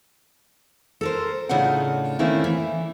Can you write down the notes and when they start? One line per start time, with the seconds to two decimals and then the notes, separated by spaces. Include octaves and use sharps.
1.01 A4 A#4 C5
1.49 A2 C#3 D4 D#4 F4 F#5
2.19 D#3 A3 A#3 C4 C#4 E4
2.44 E3